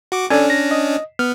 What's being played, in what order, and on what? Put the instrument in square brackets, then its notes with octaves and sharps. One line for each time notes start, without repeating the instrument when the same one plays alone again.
[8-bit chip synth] F#4 D6
[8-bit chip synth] C#4 D4 [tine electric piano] A4 D5 G#5
[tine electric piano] A#6
D#5
[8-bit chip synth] B3 [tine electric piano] F6